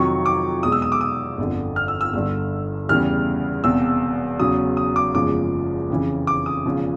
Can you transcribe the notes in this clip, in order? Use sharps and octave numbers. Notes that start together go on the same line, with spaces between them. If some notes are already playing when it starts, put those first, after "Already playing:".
Already playing: F2 C3 D#3 F#3 C#6
D6
E2 B2 G#3 D#6
E6
D#6
D6
D#6
G1 F2 D3
F6
E6
E6
G1 G2 D3 E6
E2 C#3 E3 G3 F6
E1 E2 C3 E6
E2 C#3 F#3 D#6
D#6
D6
F#1 E2 C#3 F3 G#3 D6
F2 C#3 E3
D6
D#6
E1 E2 C#3 F3